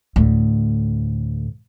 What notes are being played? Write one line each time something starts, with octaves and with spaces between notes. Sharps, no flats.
D2 A2